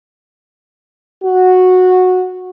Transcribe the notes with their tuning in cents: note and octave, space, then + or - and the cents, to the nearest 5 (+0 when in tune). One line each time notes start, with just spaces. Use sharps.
F#4 -10